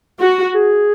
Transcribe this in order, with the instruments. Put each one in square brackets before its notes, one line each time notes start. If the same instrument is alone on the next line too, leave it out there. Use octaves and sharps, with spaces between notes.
[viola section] F#4
[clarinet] G#4